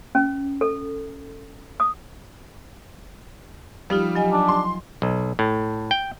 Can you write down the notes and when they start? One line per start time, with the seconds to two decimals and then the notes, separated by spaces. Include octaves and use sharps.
0.15 C#4
0.61 A4
1.80 D#6
3.90 F3 G3 D#4 F4
4.15 F#3 D#5 G#5
4.32 D4
4.48 C6
5.02 B1
5.39 A2
5.91 G5